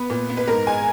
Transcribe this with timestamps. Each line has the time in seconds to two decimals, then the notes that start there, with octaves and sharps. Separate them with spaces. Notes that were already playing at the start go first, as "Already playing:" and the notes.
Already playing: B3 B4
0.10 A#2
0.30 B3
0.37 B4
0.47 G#2 A#4
0.67 G#3 G#5